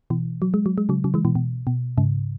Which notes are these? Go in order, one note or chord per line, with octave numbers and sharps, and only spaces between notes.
B2 E3
F#3
G#3
F#3
G#3
C#3 F#3
C#3 F#3
E3 G#3
B2 E3
B2
B2
G#2 C#3